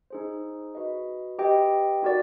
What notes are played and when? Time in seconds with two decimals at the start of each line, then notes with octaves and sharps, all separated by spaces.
0.10 D#4 G#4 C5
0.75 F#4 B4 D#5
1.39 G4 B4 D#5 G5
2.02 D#4 F#4 A#4 D5 F#5